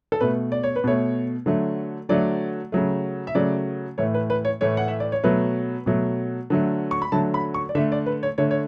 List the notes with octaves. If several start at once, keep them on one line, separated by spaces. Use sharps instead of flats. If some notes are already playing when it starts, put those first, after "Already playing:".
A4
B2 A3 B4
D5
C#5
B4
B2 A3 C#5
D3 F#3 A3
D3 F#3 A3 D5
C#3 F#3 A3
E5
C#3 F#3 A3 D5
A2 E3 A3 C#5
B4
B4
C#5
A2 E3 A3 C#5
F#5
E5
D5
C#5
B2 F#3 A3 B4
B2 F#3 A3
D3 F#3 A3
C#6
B5
D3 F#3 A3 A5
B5
C#6
D5
D3 A3 E5
D5
B4
C#5
D3 A3 C#5
C#5